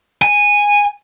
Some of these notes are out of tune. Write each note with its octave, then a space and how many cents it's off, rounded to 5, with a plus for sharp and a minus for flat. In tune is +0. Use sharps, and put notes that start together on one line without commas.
G#5 -10